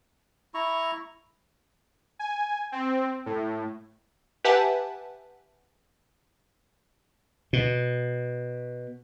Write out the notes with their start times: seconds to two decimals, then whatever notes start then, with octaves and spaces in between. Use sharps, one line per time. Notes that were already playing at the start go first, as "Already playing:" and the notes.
0.54 E4 A#5 C#6
2.19 G#5
2.72 C4
3.26 A2
4.44 G4 B4 E5 F#5 G#5 A5
7.53 B2